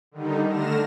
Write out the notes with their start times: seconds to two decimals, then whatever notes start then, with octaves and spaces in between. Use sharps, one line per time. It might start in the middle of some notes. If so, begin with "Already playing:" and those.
0.11 D3 D#3 G3 D#4
0.48 D3 A3 F6 A#6 E7